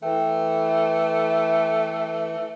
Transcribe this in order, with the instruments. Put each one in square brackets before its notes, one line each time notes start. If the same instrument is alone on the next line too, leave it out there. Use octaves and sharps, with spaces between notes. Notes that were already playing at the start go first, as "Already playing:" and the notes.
[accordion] E3 [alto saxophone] A3 [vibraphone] A4 B4 G5